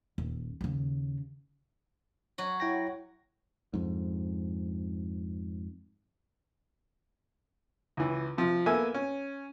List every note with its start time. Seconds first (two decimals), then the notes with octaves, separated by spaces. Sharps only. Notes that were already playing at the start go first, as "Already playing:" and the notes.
0.18 D#1
0.61 D#2 C#3
2.38 F#3 F#4
2.60 E4 G5 A#6
3.74 F2 G#2
7.97 C#2 E3
8.38 C3 F3
8.66 A#3 B3 A4 E5 G#5
8.94 C#4